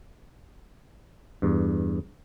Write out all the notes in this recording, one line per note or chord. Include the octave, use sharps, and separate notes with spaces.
E2 G2